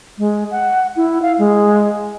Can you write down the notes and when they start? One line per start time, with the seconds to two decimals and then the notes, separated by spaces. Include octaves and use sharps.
0.18 G#3
0.51 F#5
0.96 E4
1.22 F5
1.39 G#3